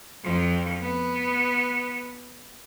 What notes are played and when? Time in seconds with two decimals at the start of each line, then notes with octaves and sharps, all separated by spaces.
0.24 F2 F3
0.81 B3